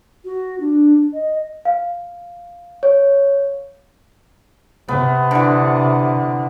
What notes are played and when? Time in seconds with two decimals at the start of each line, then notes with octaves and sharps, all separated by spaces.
0.25 F#4
0.60 D4
1.14 D#5
1.65 F5
2.83 C#5
4.88 C3 B3
5.31 D3 E3